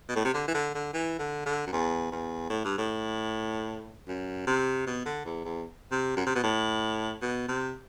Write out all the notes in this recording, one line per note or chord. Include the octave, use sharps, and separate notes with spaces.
B2
A2
C3
D3
E3
D3
D3
E3
D3
D3
F#2
E2
E2
A2
G2
A2
F#2
C3
B2
D3
E2
E2
C3
F#2
C3
B2
A2
B2
C3